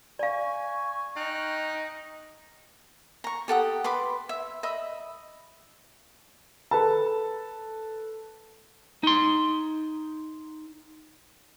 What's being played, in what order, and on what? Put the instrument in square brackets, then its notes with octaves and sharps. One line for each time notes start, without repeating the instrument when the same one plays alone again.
[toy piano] D5 F5 [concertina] G#5 [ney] C#6
[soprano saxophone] D#4 [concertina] G5 F6 F#6
[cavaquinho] A#5 C#6
G4 A4 F#5 D#6
B4 B5 C6 D6
E5
D#5 E5 B5
[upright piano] A4 B4 A5
[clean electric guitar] D#4 C6